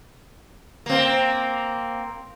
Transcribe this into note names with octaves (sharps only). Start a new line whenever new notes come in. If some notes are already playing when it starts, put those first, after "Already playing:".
A#3 C4